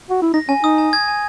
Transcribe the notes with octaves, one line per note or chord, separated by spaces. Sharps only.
F#4
E4
D#4 A#6
C#4 G#5
D#4 D#6
G#5
G#6
G#5